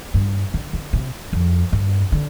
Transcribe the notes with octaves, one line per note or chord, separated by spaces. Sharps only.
G2
D3
D3
C3
F2
G2
D3